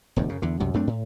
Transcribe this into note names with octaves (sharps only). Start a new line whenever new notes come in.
E1 D2 G2
F#2 C#3
E2 D3
C2 F#2 C3
F#2 A3 C4 D4
A2